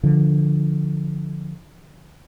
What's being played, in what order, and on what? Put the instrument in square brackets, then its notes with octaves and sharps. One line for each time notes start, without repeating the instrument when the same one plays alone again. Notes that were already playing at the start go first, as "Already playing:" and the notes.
[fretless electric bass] D3 F3